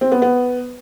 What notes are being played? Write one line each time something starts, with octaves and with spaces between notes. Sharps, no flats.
C4
B3
B3